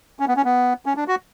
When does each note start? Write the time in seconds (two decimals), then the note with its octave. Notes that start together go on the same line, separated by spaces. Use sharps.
0.20 C#4
0.28 B3
0.36 C#4
0.45 B3
0.86 C#4
0.96 D4
1.08 F#4